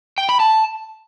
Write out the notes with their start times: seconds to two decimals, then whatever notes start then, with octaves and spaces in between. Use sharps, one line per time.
0.18 G5
0.29 B5
0.40 A5